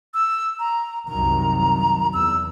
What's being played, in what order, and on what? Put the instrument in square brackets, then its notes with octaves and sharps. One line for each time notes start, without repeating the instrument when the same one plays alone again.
[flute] E6
A#5
[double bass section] C2 F#2 D#3 [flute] A#5
[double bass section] E2 [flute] E6